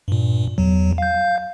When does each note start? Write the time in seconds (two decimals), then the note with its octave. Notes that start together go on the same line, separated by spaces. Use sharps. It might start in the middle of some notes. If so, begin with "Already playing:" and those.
0.08 G2 A#2
0.58 E2 F#3
0.98 F5 G6